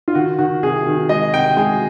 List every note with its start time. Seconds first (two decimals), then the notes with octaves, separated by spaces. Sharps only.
0.08 F4
0.15 D#3 F#4
0.39 D#3 F#4
0.63 C2 G#4
0.86 D#3
1.09 G#3 D#5
1.34 C2 G5
1.57 G#3 G#5